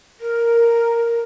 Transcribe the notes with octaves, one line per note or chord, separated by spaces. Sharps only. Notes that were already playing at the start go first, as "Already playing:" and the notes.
A#4